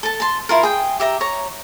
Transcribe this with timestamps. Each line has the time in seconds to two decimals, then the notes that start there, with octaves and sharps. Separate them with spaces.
0.03 A4 A5
0.20 A5 C6
0.49 E4 F4 A#4
0.63 G#4 G5
1.00 G4 E5 A#5
1.21 C#5 A#5